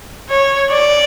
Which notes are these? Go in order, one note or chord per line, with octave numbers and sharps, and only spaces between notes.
C#5
D5